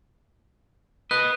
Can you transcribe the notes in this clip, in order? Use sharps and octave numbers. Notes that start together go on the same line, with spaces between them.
B4 D#5 F#6